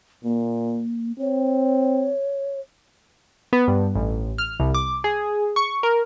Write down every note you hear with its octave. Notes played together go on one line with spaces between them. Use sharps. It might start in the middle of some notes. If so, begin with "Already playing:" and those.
A#2 A#3
C4 C#5
B3
G2
A1
F6
C2
D6
G#4
C#6
A#4